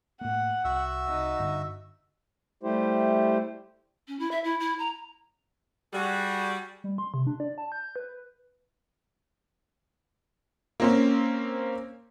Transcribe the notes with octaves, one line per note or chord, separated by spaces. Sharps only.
A2 A#3 F#5
C2 F#4 E5 E6
C2 D#4
G2 D3 D4
G3 A3 E4 G4 C5
C#4
E4
E5
E4
E4
A#5
G3 F#4 G#4
G3
C6
C3
D4
D5
A5
G6
B4
A#3 C4 C#4